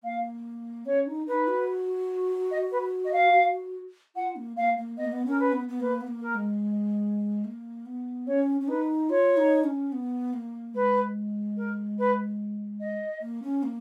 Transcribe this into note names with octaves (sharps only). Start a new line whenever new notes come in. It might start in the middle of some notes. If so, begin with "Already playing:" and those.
A#3 F5
C#4 C#5
D#4
D#4 B4
F#4
D#5
B4
D#5
F5
F#4
F4 F#5
A#3
A#3 F5
A#3
B3 D#5
A#3
B3
C#4 A#4
B4
B3
B3
A#3 B4
B3
A#3
A#4
G#3
A#3
B3
C#4 C#5
C#4
D#4 B4
F4 C#5
D#4
C#4
B3
A#3
G#3 B4
A#4
B4
D#5
A#3
C#4
A#3